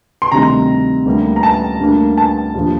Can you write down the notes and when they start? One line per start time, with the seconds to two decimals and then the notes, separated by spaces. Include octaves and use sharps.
0.22 C6
0.32 D2 C3 D#3 G3 A#5
1.06 D2 D3 G3 A#3
1.36 A#5
1.43 A5
1.80 D2 D3 G3 A#3
2.18 A5
2.54 D#2 D3 F3